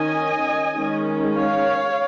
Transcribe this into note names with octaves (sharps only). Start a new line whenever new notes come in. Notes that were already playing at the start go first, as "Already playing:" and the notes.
Already playing: D#3 C#4 D#5 G#5
D#3 G#3 C#4
C#5 F5